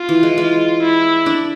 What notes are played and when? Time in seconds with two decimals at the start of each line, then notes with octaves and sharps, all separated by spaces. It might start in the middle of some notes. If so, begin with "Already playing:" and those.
Already playing: F4
0.09 E3
0.23 G#3
0.38 G#3
0.82 E4
1.26 D4